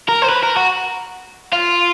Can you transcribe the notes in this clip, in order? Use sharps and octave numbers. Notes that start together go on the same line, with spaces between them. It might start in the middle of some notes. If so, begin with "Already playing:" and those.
A#4
C5
B4
A#4
F#4
F4